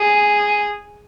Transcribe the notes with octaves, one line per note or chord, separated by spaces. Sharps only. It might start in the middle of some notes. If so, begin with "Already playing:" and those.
Already playing: G#4